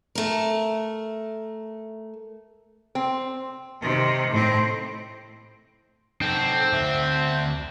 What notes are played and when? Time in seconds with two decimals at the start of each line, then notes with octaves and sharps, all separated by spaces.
0.15 A3 A#4
2.95 C4
3.80 C3 D#3
4.31 A2 C4
6.21 C4 D#4 A4
6.73 D2 E5